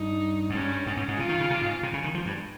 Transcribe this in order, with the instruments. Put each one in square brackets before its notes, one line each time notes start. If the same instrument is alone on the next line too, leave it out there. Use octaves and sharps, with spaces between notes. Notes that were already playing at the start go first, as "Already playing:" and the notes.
Already playing: [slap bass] G2 [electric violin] D#4
[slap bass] G#2
[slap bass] G2 [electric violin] C#4
[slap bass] G#2 [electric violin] C#4
[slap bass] G#2
G#2
[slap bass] C3 [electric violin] F4
[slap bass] D#3
C#3
C3
G#2
C3
C#3
D#3
F3
G2